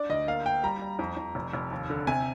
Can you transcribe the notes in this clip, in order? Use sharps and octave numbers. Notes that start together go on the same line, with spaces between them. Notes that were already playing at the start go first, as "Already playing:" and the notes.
Already playing: D4 D5
D2 D#5
A#3 F5
A#3 G5
G3 A#5
G3
F2
F2
F1
F1
D#2
D3
C3 G#5